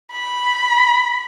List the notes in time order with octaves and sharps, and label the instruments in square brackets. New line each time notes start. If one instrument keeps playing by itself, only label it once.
[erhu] B5